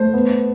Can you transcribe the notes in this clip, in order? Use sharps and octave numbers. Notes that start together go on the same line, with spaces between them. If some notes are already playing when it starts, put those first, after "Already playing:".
Already playing: A3 C5
B3